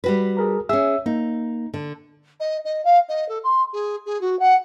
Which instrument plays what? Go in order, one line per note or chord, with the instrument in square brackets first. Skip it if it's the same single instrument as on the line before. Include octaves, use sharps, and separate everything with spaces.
[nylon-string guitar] G3 F#4 B4
[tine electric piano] G#4 A#4 A#5
[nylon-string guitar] C#4 G#4 [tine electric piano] E5 E6
[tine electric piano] A#3 [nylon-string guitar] D#4
[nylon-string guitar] D3
[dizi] D#5
D#5
F5
D#5
A4
C6
G#4
G#4
F#4
F#5